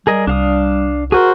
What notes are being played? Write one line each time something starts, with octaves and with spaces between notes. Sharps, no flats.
G3 G#4 A#4 D#5
C2 D4 F5 D#6
F#4 G#4 A#4 C5 C6